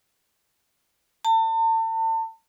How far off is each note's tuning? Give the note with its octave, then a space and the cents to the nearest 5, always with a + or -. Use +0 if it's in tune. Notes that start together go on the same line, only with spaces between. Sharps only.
A5 +35